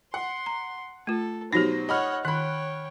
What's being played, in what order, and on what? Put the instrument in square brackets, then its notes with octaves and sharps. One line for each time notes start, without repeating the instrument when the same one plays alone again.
[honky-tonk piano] F#5 [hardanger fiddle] C6
[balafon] A#5
[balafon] A3 F4 [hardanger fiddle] A4
[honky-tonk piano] B2 F#3 A#6 [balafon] D#4 G4 [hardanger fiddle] C5
[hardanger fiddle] C#5 F#5 [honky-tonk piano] D#5 B5 F6
[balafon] D#3 [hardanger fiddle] C#5 G5 [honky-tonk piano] B5 F#6